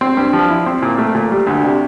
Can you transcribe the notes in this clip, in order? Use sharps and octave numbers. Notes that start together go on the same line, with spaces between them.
C4
G2
F3
E4
C4
A#2
A3
A#2
G3
D2
C3